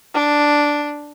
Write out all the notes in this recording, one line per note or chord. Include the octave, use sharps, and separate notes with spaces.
D4